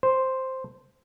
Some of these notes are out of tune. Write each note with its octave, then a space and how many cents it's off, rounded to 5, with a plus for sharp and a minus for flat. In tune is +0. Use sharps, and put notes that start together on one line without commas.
C5 +0